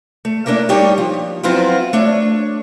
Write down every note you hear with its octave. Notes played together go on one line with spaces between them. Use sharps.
A3
A3 A#3 C#4 D4 E4
G3 D4 D#4 G4 C#5
F3
F3 F#3 B3 C4 E4 F4
A3 D4 C#5